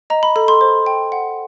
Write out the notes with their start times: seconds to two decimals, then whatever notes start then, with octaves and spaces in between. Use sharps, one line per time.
0.10 D#5 A#5
0.23 B5
0.36 A4 B5
0.48 C6
0.61 C5
0.86 G5
1.12 F#5